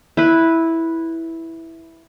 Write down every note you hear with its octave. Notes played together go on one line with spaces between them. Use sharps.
E4 B4